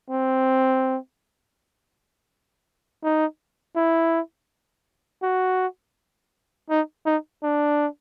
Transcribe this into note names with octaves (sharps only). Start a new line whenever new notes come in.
C4
D#4
E4
F#4
D#4
D#4
D4